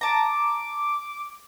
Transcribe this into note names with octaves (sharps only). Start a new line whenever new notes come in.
A5 A#5 D6